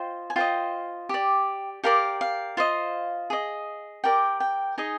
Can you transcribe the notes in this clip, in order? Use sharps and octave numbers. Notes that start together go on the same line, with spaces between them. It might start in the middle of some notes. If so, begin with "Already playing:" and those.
Already playing: F4 C5 D#5 G5
G#5
F4 C5 D#5 G5
G4 D5
G4 A#4 D5 F5
F5
F4 C5 D#5
G#4 D#5
G4 A#4 D5 G5
G5
D#4 G#4 D#5 G#5